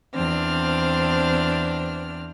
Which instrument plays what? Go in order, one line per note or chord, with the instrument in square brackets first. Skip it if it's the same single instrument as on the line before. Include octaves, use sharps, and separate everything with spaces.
[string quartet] E2 C4 D4 F6